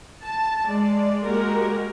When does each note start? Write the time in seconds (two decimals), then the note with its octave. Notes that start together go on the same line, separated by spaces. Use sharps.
0.23 A5
0.65 G#3 D5
1.24 G#3 A#3 F#4 G4 A#4